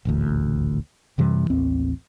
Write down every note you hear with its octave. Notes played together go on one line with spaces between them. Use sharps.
D#1 A1 D2
F#2 C3 E3 G3
A1 D#2 C4